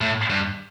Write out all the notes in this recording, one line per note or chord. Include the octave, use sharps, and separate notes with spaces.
A2
G2